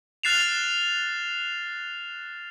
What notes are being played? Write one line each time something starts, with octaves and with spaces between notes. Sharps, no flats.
F6 F#6 A6 C7 E7 F7